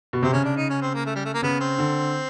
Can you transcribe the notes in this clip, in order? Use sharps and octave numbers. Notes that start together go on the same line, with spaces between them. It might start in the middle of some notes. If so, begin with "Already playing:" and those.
B2
C3 C4
C#3 C#4
D4
D#4
C#4
C4
A#3
A3
G3
A3
A#3
C#3 B3
C4
D3